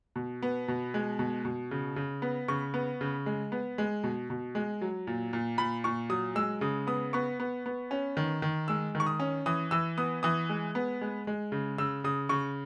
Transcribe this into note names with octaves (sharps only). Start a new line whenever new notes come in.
B2
B3
B2
G#3
B2
B2
C#3
C#3
B3
C#3 C#6
B3
C#3
G#3
B3
G#3
B2
B2
G#3
F#3
A#2
A#2
A#2 B5
A#2 C#6
F#3 D#6
G#3 E6
C#3 D#6
B3 D#6
B3 C#6
B3
B3
C#4
D#3
D#3
G#3 E6
D#3
C#6
D#6
C#4
E3 D#6
E3 E6
B3 D#6
E3 D#6
G#3
B3
G#3
G#3
C#3
C#3 E6
C#3 D#6
C#3 C#6